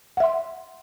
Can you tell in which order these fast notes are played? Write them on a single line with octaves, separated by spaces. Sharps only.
F#5 E5 C6